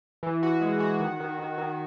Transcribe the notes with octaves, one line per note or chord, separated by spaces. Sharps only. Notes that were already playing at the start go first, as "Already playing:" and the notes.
E3
F#4
G#3
F#4
D#3
D#3
D#3
D#3